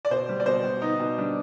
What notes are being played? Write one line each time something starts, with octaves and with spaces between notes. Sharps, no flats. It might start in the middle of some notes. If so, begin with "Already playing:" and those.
D5
B2 C5
G3
D5
B2 C5
B2
B3 D#4
B2
G3 D4